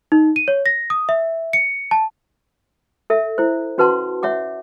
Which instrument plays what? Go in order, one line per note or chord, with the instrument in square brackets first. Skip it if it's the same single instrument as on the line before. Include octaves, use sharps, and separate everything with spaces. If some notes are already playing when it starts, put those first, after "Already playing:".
[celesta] D#4
D#7
C#5
A#6
D#6
E5
C#7
A5
[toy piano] A4 E5
E4 C5
C#4 F#4 B4 F#5 A5 C6
C#5 E5 F#5 D6